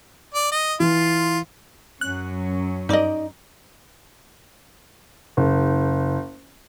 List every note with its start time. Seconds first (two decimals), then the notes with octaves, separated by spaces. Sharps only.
0.34 D5
0.52 D#5
0.80 E3 F4
2.01 F#2 F#3 C#4 F#6
2.89 G2 D#4 D5 D#5
5.37 F#1